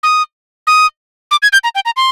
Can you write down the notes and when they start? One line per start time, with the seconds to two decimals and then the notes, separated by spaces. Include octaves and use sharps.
0.03 D#6
0.67 D#6
1.31 D6
1.42 G#6
1.53 G6
1.64 A#5
1.75 G5
1.85 A#5
1.97 C6